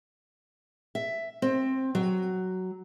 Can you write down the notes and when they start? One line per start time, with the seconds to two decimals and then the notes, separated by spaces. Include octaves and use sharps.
0.95 E5
1.42 C4
1.95 F#3